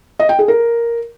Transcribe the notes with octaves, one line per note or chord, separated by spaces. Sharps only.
D#5
G5
G#4
A#4